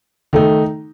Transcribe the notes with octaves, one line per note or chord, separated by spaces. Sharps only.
D#3 A3 D#4